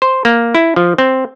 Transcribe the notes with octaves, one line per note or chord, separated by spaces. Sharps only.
C5
A#3
E4
F3
C4